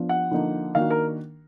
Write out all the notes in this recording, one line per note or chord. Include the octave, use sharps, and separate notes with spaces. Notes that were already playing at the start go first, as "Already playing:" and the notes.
Already playing: F3 B3 D4 F4
F#5
D3 F3 A#3 D#4
D#3 A#3 D4 F#4 F5
A#4